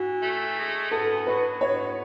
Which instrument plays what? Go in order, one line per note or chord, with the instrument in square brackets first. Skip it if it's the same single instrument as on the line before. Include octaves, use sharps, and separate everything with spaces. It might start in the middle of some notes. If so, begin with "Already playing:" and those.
Already playing: [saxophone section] E3 [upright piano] F#4
[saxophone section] A3
G#3
[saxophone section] B3 [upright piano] A4
[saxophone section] F#3 [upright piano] B4
[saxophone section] B3 [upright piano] C#5